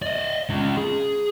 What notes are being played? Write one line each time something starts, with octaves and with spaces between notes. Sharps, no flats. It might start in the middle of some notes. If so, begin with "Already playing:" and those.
D5 D#5
C#4 F4
G#4